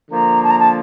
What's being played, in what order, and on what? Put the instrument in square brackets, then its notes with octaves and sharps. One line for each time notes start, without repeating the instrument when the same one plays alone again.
[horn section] D3 F3 A#3 [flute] A#5
[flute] A5
A#5
A5